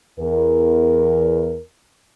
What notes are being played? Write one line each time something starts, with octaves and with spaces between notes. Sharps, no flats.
E2 A#4